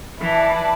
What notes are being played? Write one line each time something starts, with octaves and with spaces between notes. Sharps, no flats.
E3 E4 B4 D5 A5